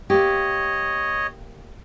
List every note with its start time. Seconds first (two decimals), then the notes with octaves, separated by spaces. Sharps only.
0.10 A#3 G4 C#5 D#5